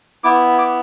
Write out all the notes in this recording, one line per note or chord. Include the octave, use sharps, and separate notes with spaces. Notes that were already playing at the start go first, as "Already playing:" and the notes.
B3 E4 D6
D6